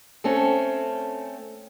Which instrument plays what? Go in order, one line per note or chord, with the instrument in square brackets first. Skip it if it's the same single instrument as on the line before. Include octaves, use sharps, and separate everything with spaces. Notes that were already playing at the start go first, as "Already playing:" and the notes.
[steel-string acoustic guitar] A3 C4 C#4 A4